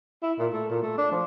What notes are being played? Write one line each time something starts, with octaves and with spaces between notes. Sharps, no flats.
E4
A#2
A3
A#2
A3
D4
F3